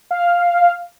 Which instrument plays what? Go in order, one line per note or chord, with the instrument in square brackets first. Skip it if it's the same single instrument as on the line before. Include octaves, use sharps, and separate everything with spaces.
[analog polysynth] F5